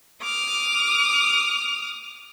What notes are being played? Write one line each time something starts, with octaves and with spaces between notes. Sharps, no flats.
D6 D#6 F6